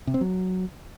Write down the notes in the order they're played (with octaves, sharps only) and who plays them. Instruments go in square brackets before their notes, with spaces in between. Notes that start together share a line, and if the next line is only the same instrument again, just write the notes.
[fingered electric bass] C3
C4
F#3